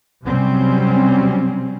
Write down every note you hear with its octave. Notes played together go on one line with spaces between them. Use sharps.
C3 F#3 G3 C4 C#4